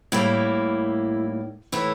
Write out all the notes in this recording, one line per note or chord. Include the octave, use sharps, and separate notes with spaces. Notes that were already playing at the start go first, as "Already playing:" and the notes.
A2 G3 A#3 E4
A2 E3 A3 E4